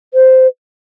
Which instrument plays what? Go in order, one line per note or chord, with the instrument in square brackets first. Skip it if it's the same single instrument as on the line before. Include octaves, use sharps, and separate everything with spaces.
[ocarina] C5